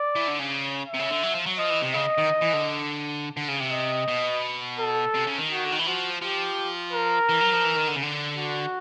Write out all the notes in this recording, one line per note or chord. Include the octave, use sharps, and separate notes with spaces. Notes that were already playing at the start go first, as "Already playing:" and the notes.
Already playing: D5
E3
D3
C#3
E5
C3
C#3
D3
F#3
F3
F#3
F3 D#5
E3
C3
C#3 D#5
D#3
E3
D3
D3
C#3
C3
D#5
B2
A4
C3
C#3
D#3
F#4
D3
D#3
E3
F3 F#4
F3 G4
A#4
E3
F#3
F3
E3
D#3
D3
C#3
D3
F#4